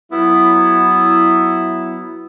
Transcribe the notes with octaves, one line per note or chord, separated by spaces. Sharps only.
F#3 B3 E4